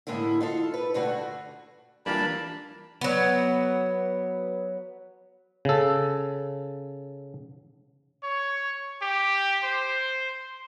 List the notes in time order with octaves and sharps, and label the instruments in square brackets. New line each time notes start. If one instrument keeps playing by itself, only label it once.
[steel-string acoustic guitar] A2 D3 G#3 A#3 E4
D#4 F4 A4
B4
G2 D3 A3 F#4
[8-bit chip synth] E3 G3 D4 [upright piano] A#3 F4 A#4 [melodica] A5 B5
[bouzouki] F#3 B3
[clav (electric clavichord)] C#3 A4
[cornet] C#5
G4
C5